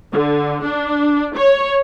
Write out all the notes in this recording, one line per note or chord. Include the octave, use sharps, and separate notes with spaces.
D3
D4
C#5